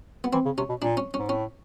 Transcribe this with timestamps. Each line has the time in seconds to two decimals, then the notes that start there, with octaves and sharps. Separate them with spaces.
0.24 B3
0.33 E3 C4
0.45 C#3
0.58 C3 C#4
0.69 B2
0.81 A#2 D4
0.97 C#4
1.14 G#2 C#4
1.29 A2 C#4